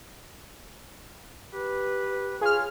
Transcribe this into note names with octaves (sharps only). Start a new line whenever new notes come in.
G4 B4
F4 G#4 C#5 F6